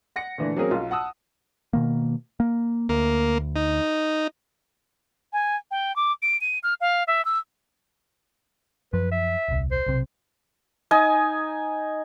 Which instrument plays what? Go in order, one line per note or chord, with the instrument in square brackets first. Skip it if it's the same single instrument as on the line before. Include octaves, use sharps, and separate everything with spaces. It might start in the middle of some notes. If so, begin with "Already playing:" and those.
[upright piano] F#5 A#6 C#7
A#2 D3 E3 A3
F#3 A#3 C4 C#4 G#4 A#4
B1 F4
F#5 A5 D#6 E6
[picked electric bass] B2 D#3 A#3
A#3
[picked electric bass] D2 [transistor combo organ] A#3
[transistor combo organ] D#4
[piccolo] G#5
G5
D6
D7
D#7
F6
F5
E5
E6
[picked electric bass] F#2 F3 [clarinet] B4
[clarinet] E5
[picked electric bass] D#1 C2
[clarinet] C5
[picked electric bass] B1 C3
[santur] D#4 G#5 D#6